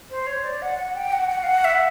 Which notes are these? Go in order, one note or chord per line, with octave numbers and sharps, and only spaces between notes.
C5
C#5
D5
F#5
F#5
G5
F#5
F#5
F5
F#5
E5